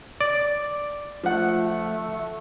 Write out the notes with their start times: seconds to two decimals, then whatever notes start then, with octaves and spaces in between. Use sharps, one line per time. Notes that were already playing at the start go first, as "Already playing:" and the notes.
0.21 D5
1.23 F3 A3 F#5